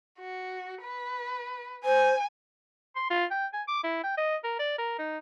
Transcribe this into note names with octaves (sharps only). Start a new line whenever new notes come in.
F#4
B4
C5 G#5
C6
F4
G5
G#5
D6
E4
G5
D#5
A#4
D5
A#4
D#4